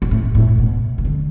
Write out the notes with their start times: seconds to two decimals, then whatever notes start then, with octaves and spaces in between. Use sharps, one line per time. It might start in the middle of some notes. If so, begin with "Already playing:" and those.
0.02 G#2
0.11 A2
0.35 A2
0.58 B2
0.98 E3
1.05 D3